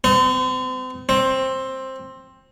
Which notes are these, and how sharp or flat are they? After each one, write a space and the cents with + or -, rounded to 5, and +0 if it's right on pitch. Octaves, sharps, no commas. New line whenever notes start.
C4 -40
C4 +10